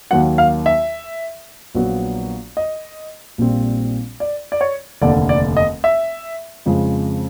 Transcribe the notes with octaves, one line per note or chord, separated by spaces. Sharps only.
D#2 D#3 F#3 F#5
F5
E5
A#1 A#2 F#3 B3
D#5
A#1 A#2 G3 C4
D5
D5
C#5
F1 D#2 D3 D5
D5
D#5
E5
F2 C#3 F3 G#3